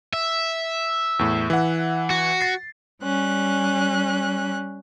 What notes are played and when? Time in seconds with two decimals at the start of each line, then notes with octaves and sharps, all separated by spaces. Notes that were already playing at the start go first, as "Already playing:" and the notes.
0.13 E5
1.19 E2 A2
1.50 E3 F#5
2.10 F#4
2.41 A6 C7
3.02 G3 C#4 F#6